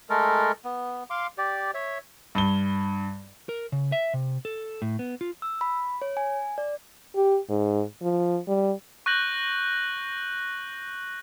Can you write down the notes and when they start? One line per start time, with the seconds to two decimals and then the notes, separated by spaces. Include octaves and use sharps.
0.10 G#3 A3 A4 A#4
0.65 B3
1.10 F5 C6 D6
1.38 G4 D5
1.74 C#5 E5
2.35 G2 G7
3.49 A#4
3.72 C#3
3.92 E5
4.14 C3
4.45 A4
4.82 A2
4.99 B3
5.21 F4
5.42 E6
5.61 B5
6.02 C#5
6.17 G#5
6.58 D5
7.16 G4
7.49 G#2
8.02 F3
8.48 G3
9.06 C#6 F#6 G6 A#6 F#7